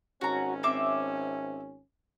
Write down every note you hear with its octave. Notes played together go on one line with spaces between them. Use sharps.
G#1 C#4 F#4 A#5
C4 E5 D6